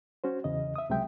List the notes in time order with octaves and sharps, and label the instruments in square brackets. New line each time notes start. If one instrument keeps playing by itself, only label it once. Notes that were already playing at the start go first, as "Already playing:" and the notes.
[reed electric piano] C#4 F#4 C5
E2 C#3 D#5
E5 D#6
C#2 C3 F#3 G#3 E5 G5